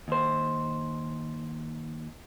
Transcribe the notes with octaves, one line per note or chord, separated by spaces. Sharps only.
D#2 C5